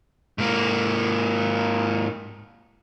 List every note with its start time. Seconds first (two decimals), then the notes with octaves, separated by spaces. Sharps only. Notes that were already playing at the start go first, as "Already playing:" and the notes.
0.38 G#2 A#3